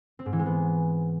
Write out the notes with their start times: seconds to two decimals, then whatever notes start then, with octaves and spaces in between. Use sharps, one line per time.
0.19 C4
0.26 G#2
0.32 E3
0.39 G#3
0.46 B3